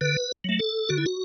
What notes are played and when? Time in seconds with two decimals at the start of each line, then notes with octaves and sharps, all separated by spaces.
0.01 D3 B4
0.44 F#3 A3
0.59 A4
0.89 D3 F#4
0.98 E4
1.06 F#4